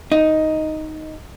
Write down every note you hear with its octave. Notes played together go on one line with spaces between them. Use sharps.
D#4